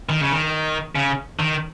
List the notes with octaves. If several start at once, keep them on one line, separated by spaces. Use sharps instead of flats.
D#3
C#3
D#3
C#3
D#3